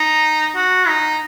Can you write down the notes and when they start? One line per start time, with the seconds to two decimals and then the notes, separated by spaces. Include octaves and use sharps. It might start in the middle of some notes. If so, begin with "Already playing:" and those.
Already playing: D#4
0.56 F#4
0.88 D#4